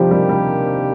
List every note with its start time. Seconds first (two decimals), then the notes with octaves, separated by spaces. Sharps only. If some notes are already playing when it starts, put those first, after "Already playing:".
Already playing: C3 D#3 F3 G3 A#3 D4 G4
0.11 G3
0.29 G3